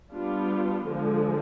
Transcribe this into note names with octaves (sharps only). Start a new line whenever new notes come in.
G3 B3 D4 F4
D3 F3 G#3